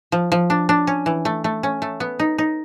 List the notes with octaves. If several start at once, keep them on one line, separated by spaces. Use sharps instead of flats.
F3
F3
D4
D4
C#4
E3
A3
A3
C#4
A3
B3
D#4
D#4